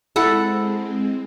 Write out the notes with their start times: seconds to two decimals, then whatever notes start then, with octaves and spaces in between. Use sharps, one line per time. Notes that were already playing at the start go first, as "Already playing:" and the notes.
0.16 G#3 C4 E4 A4 F#5